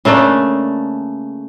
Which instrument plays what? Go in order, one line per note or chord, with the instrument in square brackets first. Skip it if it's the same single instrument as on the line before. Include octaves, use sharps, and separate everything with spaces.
[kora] C#3 A3 A#3 D4